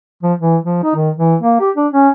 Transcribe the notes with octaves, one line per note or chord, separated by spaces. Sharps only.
F3
E3
F3
D#4
D#3
E3
A#3
G4
D4
C#4